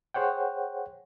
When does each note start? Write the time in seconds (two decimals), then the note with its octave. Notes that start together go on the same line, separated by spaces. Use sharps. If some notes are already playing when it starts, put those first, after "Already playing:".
0.14 G#4 C5 C#5 F#5 G5